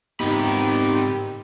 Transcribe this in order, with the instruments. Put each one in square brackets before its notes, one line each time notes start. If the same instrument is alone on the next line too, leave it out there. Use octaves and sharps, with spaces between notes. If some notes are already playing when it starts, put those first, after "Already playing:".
[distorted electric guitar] G#2 B3 [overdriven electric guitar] C4 B5 [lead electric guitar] D#4 A#4 [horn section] G4